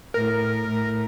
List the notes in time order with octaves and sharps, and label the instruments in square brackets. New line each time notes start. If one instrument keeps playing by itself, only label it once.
[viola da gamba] A2 [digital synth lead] A#4
[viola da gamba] A2